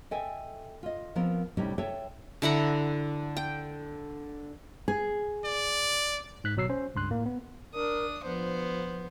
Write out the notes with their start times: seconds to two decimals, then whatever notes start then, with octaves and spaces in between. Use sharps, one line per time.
0.11 A4 D#5 E5 G5 G#5
0.83 F4 D#5
1.16 F3 B3 C4 A#4
1.57 A2 C3 G3 C#4 D#4 E4
1.78 A4 B4 C#5 E5 G5 A5
2.42 D3 E4 F#5 A#5
3.37 G5
4.88 G#4
5.45 D5
6.44 G#2 F#6 B6
6.56 G#1 B2 F#3 E6 C7
6.69 C#4 C5
6.95 C#2 G2 C6 F#6
7.10 A2 A#3
7.26 B3
7.74 D4 A#4 D#6
8.24 F3 B3 C5